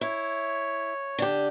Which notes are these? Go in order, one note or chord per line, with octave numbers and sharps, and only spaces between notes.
E4 C#5
D3 G4